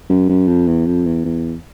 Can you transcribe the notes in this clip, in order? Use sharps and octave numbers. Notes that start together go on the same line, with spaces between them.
F#2
F#2
F2
E2
F2
E2
E2